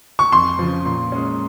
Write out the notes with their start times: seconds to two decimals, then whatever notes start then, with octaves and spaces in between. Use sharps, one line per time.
0.19 C#6
0.32 F2 C6
0.59 C#3 F3
0.85 A#2
1.12 G#3 C#4